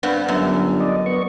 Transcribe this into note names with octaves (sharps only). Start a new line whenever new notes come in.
G2 B3 C4 D4
G1 F#2
D5 D#5
B3 C#6